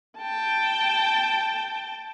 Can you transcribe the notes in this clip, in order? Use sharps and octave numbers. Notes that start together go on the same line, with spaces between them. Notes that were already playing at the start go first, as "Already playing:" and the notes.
G5 A5